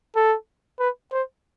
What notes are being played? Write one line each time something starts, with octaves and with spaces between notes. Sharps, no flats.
A4
B4
C5